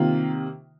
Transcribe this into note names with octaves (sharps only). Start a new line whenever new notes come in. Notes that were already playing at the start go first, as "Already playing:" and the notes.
Already playing: C3 D#3 A#3 F4